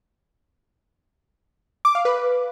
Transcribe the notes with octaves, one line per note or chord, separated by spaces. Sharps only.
D6
F5
B4